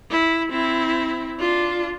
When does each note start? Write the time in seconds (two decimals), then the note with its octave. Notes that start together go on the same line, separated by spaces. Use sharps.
0.11 E4
0.49 C4 E4
1.39 D4 F4